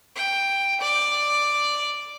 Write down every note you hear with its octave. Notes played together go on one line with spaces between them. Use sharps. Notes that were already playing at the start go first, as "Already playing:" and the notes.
G5
D5